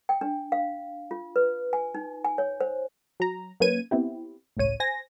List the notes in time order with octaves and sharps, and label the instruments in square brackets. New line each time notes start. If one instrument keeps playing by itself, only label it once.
[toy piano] G5
D4
F5
F4
B4
G#5
D#4
G#5
C#5
C5
[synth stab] F#3 A#5
F#3 A#3 C#4 B4 G#6 D#7
B3 C4 E4 G4
G1 C#2 A2 C#5 D#7
C5 G#5 A#6